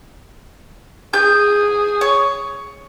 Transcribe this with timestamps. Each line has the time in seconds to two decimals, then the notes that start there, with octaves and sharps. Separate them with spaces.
1.13 G#4 G6
2.01 C#5